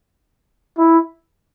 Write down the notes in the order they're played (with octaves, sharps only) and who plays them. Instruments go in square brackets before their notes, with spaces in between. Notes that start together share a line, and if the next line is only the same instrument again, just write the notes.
[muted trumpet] E4